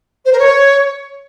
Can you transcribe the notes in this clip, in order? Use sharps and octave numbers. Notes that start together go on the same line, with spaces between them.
C5
A#4
C#5